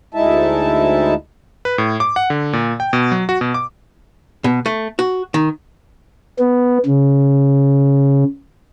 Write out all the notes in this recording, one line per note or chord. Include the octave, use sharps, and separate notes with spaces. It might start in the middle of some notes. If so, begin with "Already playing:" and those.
D2 G#3 D#4 E4 E5 A5
B4
A2
D6
F#5
D3
A#2
G5
B2
F#3
F#4
B2
D6
B2
A3
F#4
D#3
B3
C#3